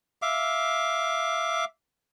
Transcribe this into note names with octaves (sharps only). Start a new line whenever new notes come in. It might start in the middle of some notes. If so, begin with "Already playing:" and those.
E5 F5 D6